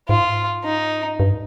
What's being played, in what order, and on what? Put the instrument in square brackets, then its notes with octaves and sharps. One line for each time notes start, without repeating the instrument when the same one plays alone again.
[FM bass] G#2 [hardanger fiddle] F4
[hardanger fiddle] D#4
[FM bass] G2